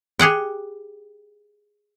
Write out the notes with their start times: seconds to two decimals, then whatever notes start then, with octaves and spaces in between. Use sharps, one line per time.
0.19 G4 G#4 F#5 G5